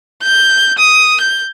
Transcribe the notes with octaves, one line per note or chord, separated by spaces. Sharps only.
G6
D#6
G6